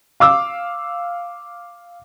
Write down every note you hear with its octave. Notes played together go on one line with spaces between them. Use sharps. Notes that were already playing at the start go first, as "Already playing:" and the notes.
F5 D6 E6